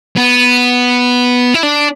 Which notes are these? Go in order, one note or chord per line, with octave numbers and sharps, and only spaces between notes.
B3
E4
D4